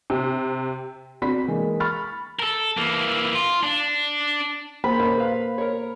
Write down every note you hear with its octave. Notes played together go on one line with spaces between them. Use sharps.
C3
C4 D4 F#4 B5 B6
E3 G#3 A#3
B5 C#6 F6 A6
A4 A#4
E3 A#3
F4
D4
A#3 C5 B5
D#2 C#4
B4 F5
A#4 C#5